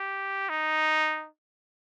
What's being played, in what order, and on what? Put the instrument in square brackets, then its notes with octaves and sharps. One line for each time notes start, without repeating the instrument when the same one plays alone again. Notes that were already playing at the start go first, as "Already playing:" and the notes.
Already playing: [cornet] G4
D#4